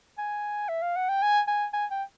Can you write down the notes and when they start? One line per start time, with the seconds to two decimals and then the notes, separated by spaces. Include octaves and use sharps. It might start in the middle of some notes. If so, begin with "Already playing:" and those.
0.18 G#5
0.69 E5
0.82 F5
0.96 F#5
1.09 G5
1.22 G#5
1.47 G#5
1.73 G#5
1.91 G5